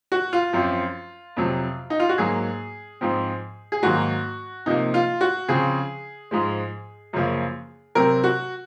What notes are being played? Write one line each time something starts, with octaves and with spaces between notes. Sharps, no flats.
F#4
F4
F#2 F3 C4
F2 C3 F#3
D#4
F4
F#4
G#2 F#3 A#3 G#4
G#2 F3 C4
G#4
G#2 D#3 F#3 A#3 F#4
C3 F3 A#3 D#4
F4
F#4
C#3 F3 C4 G#4
G#2 F3 G#3
F#2 C#3 F3 A#3
C3 F#3 C4 A#4
F#4